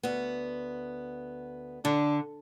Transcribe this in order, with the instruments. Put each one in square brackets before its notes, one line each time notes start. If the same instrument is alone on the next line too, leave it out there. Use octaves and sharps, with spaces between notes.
[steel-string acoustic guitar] D2 B3
[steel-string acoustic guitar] D3 [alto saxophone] D4